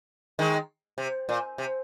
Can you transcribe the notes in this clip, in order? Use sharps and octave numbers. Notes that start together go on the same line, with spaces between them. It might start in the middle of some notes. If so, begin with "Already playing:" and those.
D#3 G#3
C3
A#2
C3